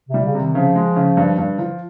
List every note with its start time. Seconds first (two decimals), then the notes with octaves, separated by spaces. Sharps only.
0.09 C3
0.14 G3
0.24 C#3
0.35 C3
0.40 D#3
0.55 C#3 F3
0.76 G#3
0.96 C#3
1.17 G2
1.38 G2
1.59 F3